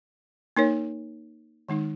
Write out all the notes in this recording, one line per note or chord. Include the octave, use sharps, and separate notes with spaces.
A#3 D#4 A#4 C#5
D#3 G#3 D#4